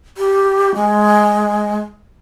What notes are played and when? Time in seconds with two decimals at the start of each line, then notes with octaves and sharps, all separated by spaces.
0.17 G4
0.75 G#3